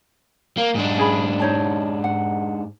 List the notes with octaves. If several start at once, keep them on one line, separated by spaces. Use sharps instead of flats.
A#3
G#2 D4
C#4 G#4 B5
D#4 C#5 A5
F#5